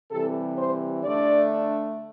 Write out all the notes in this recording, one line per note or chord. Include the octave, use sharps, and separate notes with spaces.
C3 E3 G3 A4
C5
D3 A3 D4 D5